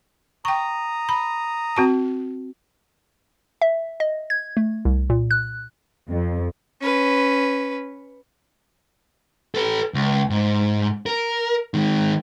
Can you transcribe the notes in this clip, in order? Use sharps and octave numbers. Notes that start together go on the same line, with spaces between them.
G5 A#5 C#6 D#6
B5
C4 F#4 A5
E5
D#5
G#6
A3
C2
A#2
F#6
F2
C#4 B4
A4 B4
C#2
G#2
A#4
D#3 G#3